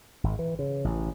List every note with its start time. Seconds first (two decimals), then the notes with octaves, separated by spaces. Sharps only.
0.24 G#1
0.39 E3
0.59 C#3
0.85 A1